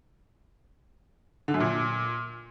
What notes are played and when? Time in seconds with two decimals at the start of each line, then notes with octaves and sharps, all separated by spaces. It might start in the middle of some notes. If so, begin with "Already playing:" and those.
1.48 D3
1.54 F#2
1.60 A#2